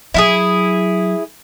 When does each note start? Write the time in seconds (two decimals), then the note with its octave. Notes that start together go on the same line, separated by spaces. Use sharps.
0.14 F#3 E4 F4 G#4